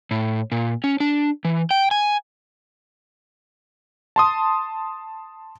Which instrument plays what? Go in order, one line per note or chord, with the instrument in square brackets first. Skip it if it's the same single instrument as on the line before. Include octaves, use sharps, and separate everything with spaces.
[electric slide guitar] A2
A#2
C#4
D4
E3
G5
G#5
[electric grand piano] A5 C6 D#6